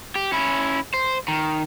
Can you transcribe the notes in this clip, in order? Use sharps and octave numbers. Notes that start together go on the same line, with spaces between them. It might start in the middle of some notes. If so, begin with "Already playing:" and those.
G4
C#4 E4
C5
D#3